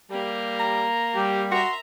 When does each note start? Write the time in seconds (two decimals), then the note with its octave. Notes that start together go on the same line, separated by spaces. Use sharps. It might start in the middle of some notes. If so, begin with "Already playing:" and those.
0.11 G3 A#3 G4
0.60 A#5
1.15 G3 G4
1.52 F#4 E5 A#5 C6